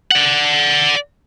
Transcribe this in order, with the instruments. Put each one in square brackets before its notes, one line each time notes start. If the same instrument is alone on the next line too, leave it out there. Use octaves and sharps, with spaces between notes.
[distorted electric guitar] D5 F#5